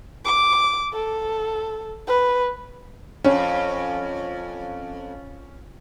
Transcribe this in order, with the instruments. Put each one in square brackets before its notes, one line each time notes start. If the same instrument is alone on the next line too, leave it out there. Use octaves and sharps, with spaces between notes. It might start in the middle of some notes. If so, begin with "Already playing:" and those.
[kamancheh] D6
A4
B4
[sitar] F2 [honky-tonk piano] C#4